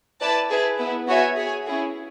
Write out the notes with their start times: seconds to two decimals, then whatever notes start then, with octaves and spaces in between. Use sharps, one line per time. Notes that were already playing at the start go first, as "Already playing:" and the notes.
0.22 E4 B4 D5 A5
0.50 E4 G#4 B4
0.79 B3 E4 B4
1.08 B3 F#4 C#5 E5 G#5
1.37 G#4 C#5 G#5
1.65 C#4 E4 G#4